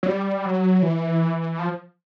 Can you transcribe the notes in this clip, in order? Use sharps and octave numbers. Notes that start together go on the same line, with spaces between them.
F#3
G3
F#3
E3
F3